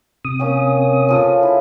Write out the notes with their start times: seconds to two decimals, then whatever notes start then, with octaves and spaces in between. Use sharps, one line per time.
0.25 C3 D#6
0.39 A#3 C#4 G5
1.09 C#3 F3 A4
1.43 E4